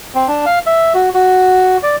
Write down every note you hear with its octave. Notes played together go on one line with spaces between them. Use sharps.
C4
D4
F5
E5
F#4
F#4
D5